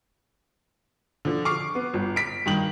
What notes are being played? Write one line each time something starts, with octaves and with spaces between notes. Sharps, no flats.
D3 F3
C#6 D6 F6 C7
B3
G1
B6 D7
G2 D#3 F#7